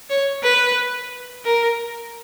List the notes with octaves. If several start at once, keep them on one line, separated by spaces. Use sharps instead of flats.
C#5
B4
A#4